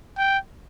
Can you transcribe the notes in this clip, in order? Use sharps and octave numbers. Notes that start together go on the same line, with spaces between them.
G5